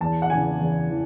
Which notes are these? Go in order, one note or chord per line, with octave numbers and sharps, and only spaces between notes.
E2 A5
F#5
C#3 E3 G#5
E2
E3